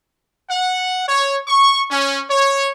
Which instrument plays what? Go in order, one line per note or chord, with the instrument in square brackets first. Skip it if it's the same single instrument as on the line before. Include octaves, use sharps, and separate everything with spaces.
[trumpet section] F#5
C#5
C#6
C#4
C#5